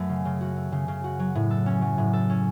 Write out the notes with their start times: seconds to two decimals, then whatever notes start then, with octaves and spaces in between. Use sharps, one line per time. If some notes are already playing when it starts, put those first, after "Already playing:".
Already playing: F#2 F#3 A3 B3
0.09 C#3
0.25 C#3
0.41 F#4
0.57 A3
0.72 C#3
0.88 C#3
1.04 F#4
1.19 F#3
1.35 A2
1.51 A4
1.66 C#4
1.82 F#3
1.98 A2
2.13 A4
2.30 C#4